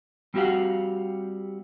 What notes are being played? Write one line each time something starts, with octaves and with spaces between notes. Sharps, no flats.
G3 C4 F#4 G4 F5 F#5